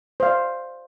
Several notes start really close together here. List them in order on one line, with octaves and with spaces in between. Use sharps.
C5 F5 D5